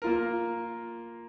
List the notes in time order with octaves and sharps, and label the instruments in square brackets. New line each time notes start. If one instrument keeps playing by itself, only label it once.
[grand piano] A#3 F4 A#4